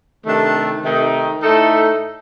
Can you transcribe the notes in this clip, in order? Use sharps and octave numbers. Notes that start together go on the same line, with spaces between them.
C3 D#3 A3 D4 G4
C3 D#3 A3 D#4
A2 A3 D#4 A4